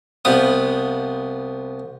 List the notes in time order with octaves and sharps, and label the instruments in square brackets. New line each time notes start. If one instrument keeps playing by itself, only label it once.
[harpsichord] C2 F3 B3 D#6